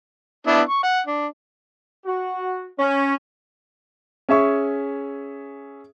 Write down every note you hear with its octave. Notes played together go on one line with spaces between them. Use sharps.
B3 D4 E4
C#6
F#5
D4
F#4
C#4
C#4 G#4 E5 C#6